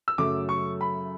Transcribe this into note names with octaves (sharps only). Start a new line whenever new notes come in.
E6
F#2 C#3 F#3 A3 D6
C#6
B5